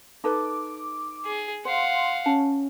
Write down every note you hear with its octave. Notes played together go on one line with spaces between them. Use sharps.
D#4 A4 B4 D6
G#4
C5 F5 F#5 C6
C#4 A5